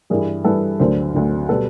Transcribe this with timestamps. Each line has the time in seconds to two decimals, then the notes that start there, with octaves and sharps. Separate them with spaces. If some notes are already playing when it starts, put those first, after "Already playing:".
0.10 G2 E3 G3 G#4 A#4
0.44 G2 E3 G3 A4 B4
0.80 D2 D3 F#3 A#4 C5
1.14 D2 D3 F#3
1.49 B2 G3 A4 B4